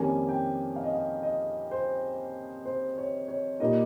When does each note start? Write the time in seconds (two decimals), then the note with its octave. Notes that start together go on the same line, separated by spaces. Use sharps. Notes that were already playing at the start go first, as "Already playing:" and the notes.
Already playing: F2 D#3 G3 A#3 C#4 G#5
0.29 G5
0.76 F5
0.84 D#5
0.93 F5
1.23 D#5
1.71 C5
2.65 C5
2.98 C#5
3.28 C#5
3.60 A#2 G3 A#3 D#4 D#5